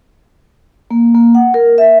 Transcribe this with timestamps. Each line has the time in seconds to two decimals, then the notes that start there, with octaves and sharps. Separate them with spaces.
0.91 A#3
1.15 A#3
1.35 F#5
1.54 A#4
1.78 E5